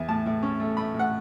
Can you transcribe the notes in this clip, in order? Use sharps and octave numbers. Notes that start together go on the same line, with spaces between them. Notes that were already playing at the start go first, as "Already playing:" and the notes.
Already playing: E2
A2 A5
A2
C#4
A3
A3 B5
A2
F#5